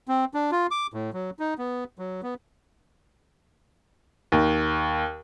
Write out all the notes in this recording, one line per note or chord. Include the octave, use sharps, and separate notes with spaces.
C4
D4
F4
D6
A2
F#3
D#4
B3
F#3
B3
D#2